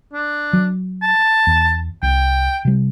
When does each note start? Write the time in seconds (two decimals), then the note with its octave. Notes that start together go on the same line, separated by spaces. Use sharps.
0.13 D4
0.53 F#3
1.02 A5
1.47 E2
2.02 C2 G5
2.65 C3 G3